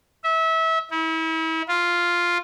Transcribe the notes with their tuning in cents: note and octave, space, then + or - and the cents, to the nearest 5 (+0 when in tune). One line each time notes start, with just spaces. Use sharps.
E5 -25
E4 -35
F4 +0